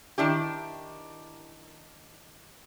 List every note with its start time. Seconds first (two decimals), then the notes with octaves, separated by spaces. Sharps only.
0.18 D#3 D4 E4 G4